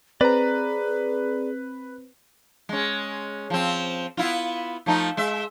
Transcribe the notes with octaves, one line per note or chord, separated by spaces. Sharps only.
C4 G#4 B4 D5 A#5
G#3 C#4
F3 C4
B3 E4 F4
F3 A3 D#4
G#3 E5